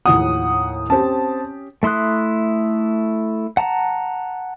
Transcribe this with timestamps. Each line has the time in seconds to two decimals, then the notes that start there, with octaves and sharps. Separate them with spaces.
0.05 D#2 A2 F3 F#5 D#6
0.90 C4 C#4 G4 A5
1.83 A3 E4 C6 D#6 F#6
3.57 F#5 A5 A#5